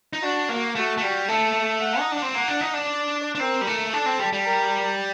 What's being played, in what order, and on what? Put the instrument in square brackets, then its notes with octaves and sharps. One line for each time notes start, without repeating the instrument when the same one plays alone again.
[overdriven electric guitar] D#4
[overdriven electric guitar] D4 [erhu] F#4
[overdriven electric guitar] A#3
[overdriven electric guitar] A3 [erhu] F#4
[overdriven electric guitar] A3
G3
[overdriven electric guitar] A3 [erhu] A4
[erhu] F#5
[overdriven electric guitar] D#4
D4
C4
[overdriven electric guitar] A#3 [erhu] F#5
[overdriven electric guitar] D4
D#4
D4
[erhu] D5
[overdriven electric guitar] D4
[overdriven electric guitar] C4 [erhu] A#4
[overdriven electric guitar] G3
A3
[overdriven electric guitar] D4 [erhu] A4
[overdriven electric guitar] C4
G3
G3
[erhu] A#4